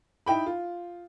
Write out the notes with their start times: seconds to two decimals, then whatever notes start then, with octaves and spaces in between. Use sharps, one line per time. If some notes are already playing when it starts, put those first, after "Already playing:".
0.26 D#4 E4 G5 B5
0.46 F4